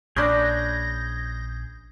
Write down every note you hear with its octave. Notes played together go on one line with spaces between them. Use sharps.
A#1 C#4 D4 G#4 B5 F#6 G6 A#6